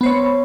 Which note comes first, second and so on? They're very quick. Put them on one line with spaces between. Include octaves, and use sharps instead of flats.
B3 C5 C#5